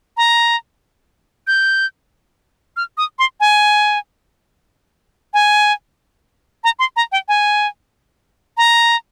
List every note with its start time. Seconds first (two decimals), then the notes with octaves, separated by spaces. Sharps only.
0.17 A#5
1.47 G6
2.77 F6
2.98 D#6
3.19 C6
3.40 G#5
5.34 G#5
6.64 A#5
6.79 C6
6.96 A#5
7.12 G5
7.28 G#5
8.57 A#5